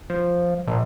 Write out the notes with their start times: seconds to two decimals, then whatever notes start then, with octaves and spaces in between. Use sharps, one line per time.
0.10 F3
0.67 A#1